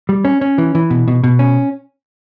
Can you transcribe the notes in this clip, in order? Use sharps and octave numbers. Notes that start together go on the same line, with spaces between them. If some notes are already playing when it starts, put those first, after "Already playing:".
G3
C#4
C#4
E3
E3
B2
B2
B2
C#4